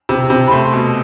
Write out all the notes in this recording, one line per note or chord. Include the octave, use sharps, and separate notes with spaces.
C3
C3
B5
A3 C6
B2